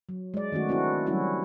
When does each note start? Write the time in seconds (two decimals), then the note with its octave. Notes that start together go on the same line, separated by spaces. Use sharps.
0.09 F#3
0.34 G#3 D5
0.52 D#3 A3 C#4 F#4
0.69 C4 D4 E4 F#4
1.06 F#3 G3 C#4 E4 F#4